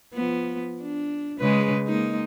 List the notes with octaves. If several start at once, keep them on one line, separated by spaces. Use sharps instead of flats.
F3 B3
D4
C#3 G#3 B4
G#3 A#3 D#4